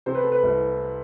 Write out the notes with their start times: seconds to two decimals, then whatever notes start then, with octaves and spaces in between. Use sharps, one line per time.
0.06 C3 C5
0.15 B4
0.23 A4
0.32 B4
0.43 C2